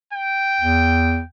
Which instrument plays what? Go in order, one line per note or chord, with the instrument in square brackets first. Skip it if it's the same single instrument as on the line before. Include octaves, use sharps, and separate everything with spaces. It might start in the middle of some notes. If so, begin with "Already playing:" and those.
[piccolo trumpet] G5
[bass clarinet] E2